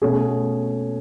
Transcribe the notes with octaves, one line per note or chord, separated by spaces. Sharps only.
B2 A3 C#4 G#4